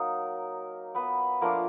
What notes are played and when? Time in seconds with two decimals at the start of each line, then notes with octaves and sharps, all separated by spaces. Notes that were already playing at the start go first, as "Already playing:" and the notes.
Already playing: F#3 A#3 D#4 A#4
0.94 B3 B4
1.41 F3 A3 A#3 D4 F4 A#4